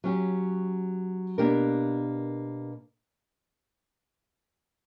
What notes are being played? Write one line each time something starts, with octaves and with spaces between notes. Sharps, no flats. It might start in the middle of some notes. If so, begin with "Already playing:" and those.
F#3 C#4 G4
B2 A#3 D4 G4 A#4